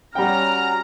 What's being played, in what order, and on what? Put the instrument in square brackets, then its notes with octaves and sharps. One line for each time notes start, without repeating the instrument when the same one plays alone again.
[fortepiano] G3 G5 [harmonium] C#4 F#4 [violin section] A#5 [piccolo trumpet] F6